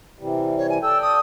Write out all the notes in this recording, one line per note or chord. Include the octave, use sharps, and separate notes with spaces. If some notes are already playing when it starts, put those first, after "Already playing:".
C3 E3 G3
C#5
G#5
A4 D5 G5 E6
D#6